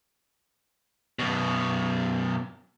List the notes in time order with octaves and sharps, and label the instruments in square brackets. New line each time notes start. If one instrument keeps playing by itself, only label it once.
[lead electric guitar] F#2 B2